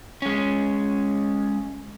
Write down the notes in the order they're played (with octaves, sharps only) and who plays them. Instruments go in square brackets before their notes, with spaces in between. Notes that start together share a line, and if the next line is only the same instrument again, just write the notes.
[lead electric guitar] G#3 C#4